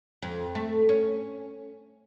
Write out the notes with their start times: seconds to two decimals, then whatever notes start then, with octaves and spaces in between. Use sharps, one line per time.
0.22 F2
0.55 A3
0.89 C#4